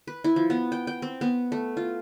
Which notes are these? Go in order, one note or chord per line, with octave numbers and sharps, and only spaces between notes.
B4
E4
F3
B3
G5
G5
C4
B3
A3
F4